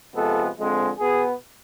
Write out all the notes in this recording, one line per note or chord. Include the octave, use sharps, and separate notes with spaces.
C3 F3 G#3 B3 A4
F2 D3 G#3 C4
B2 B3 G#4